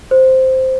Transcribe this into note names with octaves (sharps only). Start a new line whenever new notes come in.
C5